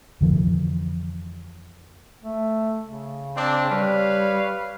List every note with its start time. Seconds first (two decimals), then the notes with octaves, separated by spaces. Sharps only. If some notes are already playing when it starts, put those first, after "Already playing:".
0.21 F2 D3 E3 F3
2.24 A3
2.86 C#3
3.36 C4 D4
3.70 G3 B4 C#5 F5